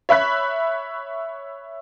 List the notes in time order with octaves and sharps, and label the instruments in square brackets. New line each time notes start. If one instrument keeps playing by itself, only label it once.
[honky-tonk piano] C#5 E5 B5 F#6 B6